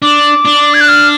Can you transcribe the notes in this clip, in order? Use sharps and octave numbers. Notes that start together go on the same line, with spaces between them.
D4 D6
D4
G#6
F#6
F6